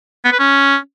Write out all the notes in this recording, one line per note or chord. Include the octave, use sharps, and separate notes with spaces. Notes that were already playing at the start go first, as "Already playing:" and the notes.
B3
B4
C#4